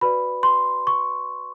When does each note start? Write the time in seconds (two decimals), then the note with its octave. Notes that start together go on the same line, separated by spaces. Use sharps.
0.01 F#4 B4 D5 B5
0.43 C6
0.87 C#6